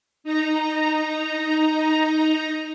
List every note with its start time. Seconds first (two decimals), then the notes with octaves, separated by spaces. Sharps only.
0.24 D#4 A#5